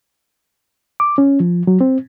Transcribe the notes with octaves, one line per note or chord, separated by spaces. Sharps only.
D6
C#4
F3
F#3
C4